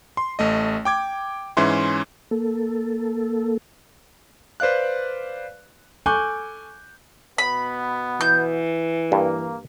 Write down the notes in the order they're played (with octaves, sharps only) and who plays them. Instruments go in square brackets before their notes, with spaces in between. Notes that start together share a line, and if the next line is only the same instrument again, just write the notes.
[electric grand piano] C6
A1 A3 D#5
G5 D6 G#6
G#2 E3 C#4 E5 C6
[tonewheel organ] A#3 A4
[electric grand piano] B4 C5 D5 F5 F#6
[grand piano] A4 G#5 C#6 D6 F#6 G6
[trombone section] B2 B3 [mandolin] B5
[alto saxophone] E3 [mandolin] G6
[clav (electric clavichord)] G2 [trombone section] A#3